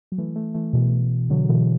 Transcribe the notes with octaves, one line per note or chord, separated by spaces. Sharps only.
F#3
E3 A3
E3 A3
E3 A3
B2 E3
D3 F#3
B2 E3